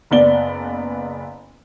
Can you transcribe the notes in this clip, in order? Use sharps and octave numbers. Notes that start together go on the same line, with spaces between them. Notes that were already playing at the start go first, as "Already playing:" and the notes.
F#1 B3 D5 G7